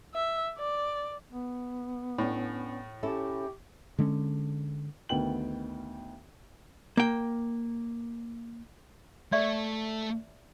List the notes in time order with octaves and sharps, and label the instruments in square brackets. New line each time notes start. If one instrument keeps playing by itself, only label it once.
[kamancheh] E5
D5
[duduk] B3
[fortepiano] A2 [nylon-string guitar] C#4 D4
[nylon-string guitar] C#4 E4 A4 [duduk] G4
[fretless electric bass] D3 G#3 C4 C#4
[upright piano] D2 D#3 B3 G5 F#7
[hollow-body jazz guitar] A#3 G5
[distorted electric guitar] A3 [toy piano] D5 E5 C#6